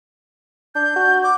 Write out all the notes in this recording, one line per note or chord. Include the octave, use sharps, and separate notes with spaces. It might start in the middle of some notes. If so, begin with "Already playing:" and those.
D4 G6
F#4
D6